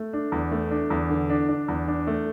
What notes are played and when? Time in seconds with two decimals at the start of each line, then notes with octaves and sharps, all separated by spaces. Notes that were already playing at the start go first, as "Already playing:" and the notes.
Already playing: A3
0.13 D4
0.32 E2
0.51 A3
0.71 D4
0.90 E2
1.10 D3
1.30 D4
1.49 D4
1.68 E2
1.88 D4
2.07 A3